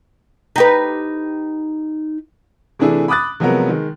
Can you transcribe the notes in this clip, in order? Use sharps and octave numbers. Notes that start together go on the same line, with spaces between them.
D#4 G4 B4
C3 E3 A3 D4 E4 G#4
B5 D6 D#6 F#6 A6
C3 F3 F#3 G#3 B3 A#4
D#3 G#3